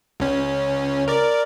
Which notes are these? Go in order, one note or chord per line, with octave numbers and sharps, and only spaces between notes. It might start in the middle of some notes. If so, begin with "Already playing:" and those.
C#2 C#4
A#4 D5